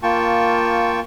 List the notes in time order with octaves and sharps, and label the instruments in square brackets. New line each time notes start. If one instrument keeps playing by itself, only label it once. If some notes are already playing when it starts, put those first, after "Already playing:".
[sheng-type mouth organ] A#3 F4 G5 A5 C#6